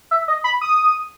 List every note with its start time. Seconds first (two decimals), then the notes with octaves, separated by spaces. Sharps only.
0.11 E5
0.28 D#5
0.44 B5
0.61 D#6